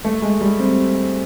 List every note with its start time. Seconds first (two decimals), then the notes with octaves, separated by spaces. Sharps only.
0.05 A3
0.22 G#3
0.41 G3
0.59 C4